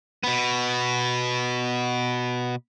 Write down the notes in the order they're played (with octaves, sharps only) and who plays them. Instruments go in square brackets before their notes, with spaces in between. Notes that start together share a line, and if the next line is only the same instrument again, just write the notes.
[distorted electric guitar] B2 B3